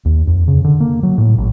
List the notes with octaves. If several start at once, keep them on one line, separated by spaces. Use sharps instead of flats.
D#2
F2
C#3
D3
A#3
F#3
A2
A1